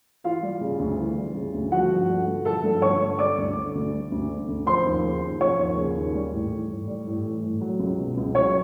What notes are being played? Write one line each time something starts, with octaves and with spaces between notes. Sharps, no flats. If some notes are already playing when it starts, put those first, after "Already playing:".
E3 F4 F5
G3
C#3
D2
E3
G3
C#3
D2
F3 F#4 F#5
G2
D3
G2
F3 A4 A5
G2
D3 C#5 C#6
G2
G3 D5 D6
D2
D3
D2
G3
D2
D3
D2
F3 C5 C6
D#2
C#3
D#2
F3 C#5 C#6
D#2
C#3
D#2
G3
A2
E3
A2
G3
A2
E3
A2
F#3
C#2
B2
C#2
F#3 C#5 C#6